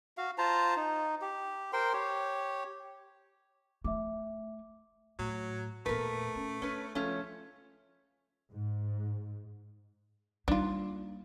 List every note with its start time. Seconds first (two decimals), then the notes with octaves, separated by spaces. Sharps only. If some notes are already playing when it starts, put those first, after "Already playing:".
0.18 F#4 F5
0.38 F4 C5 A5 A#5
0.76 D#4
1.22 G4
1.73 A#4 C5 G5 C6
1.93 G4 C#5
3.84 A3 E5 D6
5.19 A2 F#3
5.86 E2 A#2 A3 A#4 B4
6.35 C#4
6.62 C#4 D4 B4
6.95 C#2 F3 A3 C#4 E4
8.52 G#2
10.48 G3 A#3 D4 D#4 F4